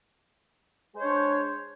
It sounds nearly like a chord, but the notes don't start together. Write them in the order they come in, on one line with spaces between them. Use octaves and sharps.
G#3 C5 C#5 D4